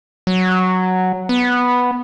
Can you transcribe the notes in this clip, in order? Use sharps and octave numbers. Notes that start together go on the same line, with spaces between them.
F#3
B3